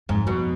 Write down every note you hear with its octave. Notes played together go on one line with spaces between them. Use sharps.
F2 G#2
F2 B2